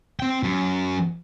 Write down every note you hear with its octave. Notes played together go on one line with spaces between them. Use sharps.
C4 G5
F#2